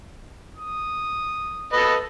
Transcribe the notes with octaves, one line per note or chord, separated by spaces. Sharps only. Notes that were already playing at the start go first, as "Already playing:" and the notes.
D#6
A4 B4 D#5